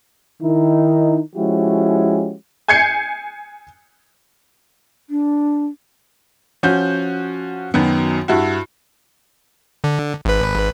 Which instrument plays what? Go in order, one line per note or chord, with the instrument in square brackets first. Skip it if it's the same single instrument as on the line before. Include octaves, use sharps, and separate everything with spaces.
[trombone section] D#3 D#4 E4
F3 G#3 C#4 E4 F#4 G4
[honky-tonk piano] G#5 G6 G#6 C7 C#7
[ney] D4
[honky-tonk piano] F3 C#4 F#4 G6
F#2 D#3 F#3 B3
G2 E4 F#4
[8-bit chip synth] D3
G#1 B4